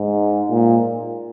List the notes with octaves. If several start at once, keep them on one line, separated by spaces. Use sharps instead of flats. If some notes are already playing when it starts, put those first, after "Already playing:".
Already playing: G#2
A#2